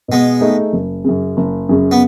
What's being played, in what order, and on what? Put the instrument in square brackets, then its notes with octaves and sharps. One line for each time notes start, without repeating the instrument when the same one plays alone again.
[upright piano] B2 [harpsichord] G#3 B3
[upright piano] A3 D#4 G#4
F#1
F#2 C#3
F#1
F#2 C#3
[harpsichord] B3